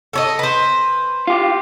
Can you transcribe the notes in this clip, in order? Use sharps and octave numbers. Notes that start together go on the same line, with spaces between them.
A4 C#5 D#5
B4 C5
F4 G4